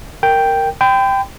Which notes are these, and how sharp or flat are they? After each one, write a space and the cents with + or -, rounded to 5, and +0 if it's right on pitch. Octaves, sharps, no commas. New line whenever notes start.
A#4 -10 G5 +0
G5 +0 B5 +45